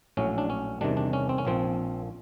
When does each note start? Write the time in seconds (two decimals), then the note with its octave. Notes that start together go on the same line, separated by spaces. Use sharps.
0.17 A#1 A2 F#3 C#4
0.38 D4
0.50 C#4
0.81 E2 C3 D#3 G3 D4
0.97 D4
1.13 C#4
1.29 C4
1.38 C#4
1.45 A#1 A#2 F3 C4